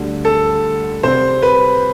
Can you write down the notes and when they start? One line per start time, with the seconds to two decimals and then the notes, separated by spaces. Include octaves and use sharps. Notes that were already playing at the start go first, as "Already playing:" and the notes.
Already playing: D2 D3 G3
0.25 A4
1.03 C3 G3 C4 C5
1.42 B4